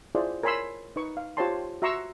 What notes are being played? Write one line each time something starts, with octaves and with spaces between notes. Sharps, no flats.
E4 F4 G#4 C5 D5
A#4 C#5 G#5 B5 C6 E6
D#4 B4 C#6
F5
F4 G4 C5 C#5 A5 C6
F#4 E5 A#5 C6 C#6 E6